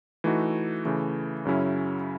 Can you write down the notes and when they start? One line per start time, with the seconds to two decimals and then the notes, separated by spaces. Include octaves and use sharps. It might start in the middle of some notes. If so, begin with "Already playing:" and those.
0.24 E3 A3 D#4 F#4
0.85 C#3 E3 A3
1.45 F#2 C#3 F#3 C#4 E4